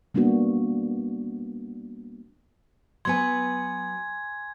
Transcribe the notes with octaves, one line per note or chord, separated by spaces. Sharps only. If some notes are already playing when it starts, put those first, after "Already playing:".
G3 A#3 B3 D4 F#4
F#3 B3 B4 G#5 C6 G#6